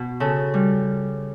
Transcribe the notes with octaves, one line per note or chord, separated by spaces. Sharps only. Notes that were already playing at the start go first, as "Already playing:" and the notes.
Already playing: B2
C#3 A4
G3